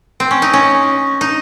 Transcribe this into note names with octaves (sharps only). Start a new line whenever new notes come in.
C4
C#4
D#4
C#4
D#4